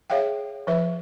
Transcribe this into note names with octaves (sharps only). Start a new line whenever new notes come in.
G#4 C#5 E5 F5 G5
F3 B4 E5